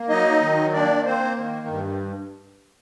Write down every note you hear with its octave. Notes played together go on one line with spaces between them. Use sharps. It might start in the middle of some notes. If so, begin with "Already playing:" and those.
Already playing: A#3
F#3 D#4 D#5
D#3
A#3 D4 D5
A#3 C4 C5
D#3
G2